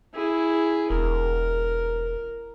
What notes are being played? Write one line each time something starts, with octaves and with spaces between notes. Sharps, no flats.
E4 G#4
E1 A#4